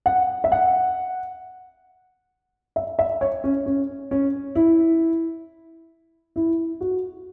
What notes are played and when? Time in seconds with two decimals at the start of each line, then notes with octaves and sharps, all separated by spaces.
0.06 F#5
0.44 E5
0.52 F#5
2.76 E5
2.99 E5
3.21 C#5
3.44 C#4
3.66 C#4
4.11 C#4
4.55 E4
6.36 E4
6.81 F#4